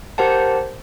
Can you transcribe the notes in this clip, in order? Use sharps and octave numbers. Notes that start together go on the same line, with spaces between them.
G4 A#4 C5 F#5 A5